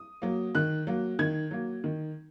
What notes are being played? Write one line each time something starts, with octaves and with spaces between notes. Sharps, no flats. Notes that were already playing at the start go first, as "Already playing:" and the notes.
Already playing: D#6
F#3 A#3
D#3 F#6
F#3 A#3
D#3 G#6
F#3 A#3
D#3